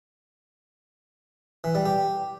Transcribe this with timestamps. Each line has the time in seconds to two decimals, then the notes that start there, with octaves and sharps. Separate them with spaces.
1.64 E3
1.75 G3
1.86 G4